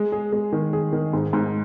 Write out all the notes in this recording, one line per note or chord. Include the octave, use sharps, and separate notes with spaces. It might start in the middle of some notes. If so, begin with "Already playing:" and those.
Already playing: G#3
G#4
G#3
D#3
G#4
D#3
G#2
G#2